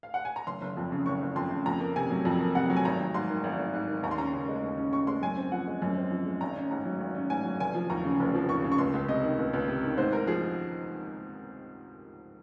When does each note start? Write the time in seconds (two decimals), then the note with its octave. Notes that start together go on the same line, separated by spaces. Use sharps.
0.03 F5
0.14 F#5
0.25 G#5
0.36 A#5
0.47 F#1 C6
0.62 F#1
0.77 F2
0.92 C#3
1.06 F#1 C#6
1.22 F#1
1.36 F2 C6
1.51 C#3
1.66 F2 A#5
1.81 A#3
1.96 C3 G#5
2.10 F#3
2.25 F2
2.40 A#3
2.55 C3 F#5
2.70 F#3
2.76 G#5
2.85 G#1 A#5
2.99 G#1
3.14 G#2 C6
3.30 D#3
3.44 G#1
3.59 G#1
3.74 G#2
3.89 D#3
4.03 D#2 A#5
4.11 C6
4.18 C#4 A#5
4.33 C#3
4.48 G#3
4.63 D#2
4.77 C#4
4.92 C#3 C#6
5.07 G#3 C6
5.22 F#2 G#5
5.37 C4
5.52 F3 F#5
5.67 G#3
5.82 F#2 G#5
5.97 C4
6.11 F3
6.26 G#3
6.41 G#1 A#5
6.56 C#4
6.71 G#2 A#5
6.85 F#3
7.01 G#1
7.15 C#4
7.30 G#2 G#5
7.45 F#3
7.60 F1 G#5
7.75 F3
7.90 D#2 A#5
8.05 C#3
8.20 F1
8.34 F3
8.49 D#2 C#6
8.64 C#3
8.72 C#6
8.78 C#2 C6
8.94 C#2
9.08 C3 D#5
9.23 D#3
9.39 C#2
9.53 C#2
9.68 C3
9.83 D#3
9.97 G#2 C5
10.12 G#2 A#4
10.27 F3 G#4